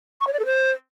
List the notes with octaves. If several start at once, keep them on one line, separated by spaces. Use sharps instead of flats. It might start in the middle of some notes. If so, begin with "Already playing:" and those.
C#6
C#5
D5
A4
C5